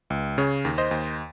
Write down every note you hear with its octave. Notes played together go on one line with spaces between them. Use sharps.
C#2
C#3 C#5
D#2
C5 D#5
D#2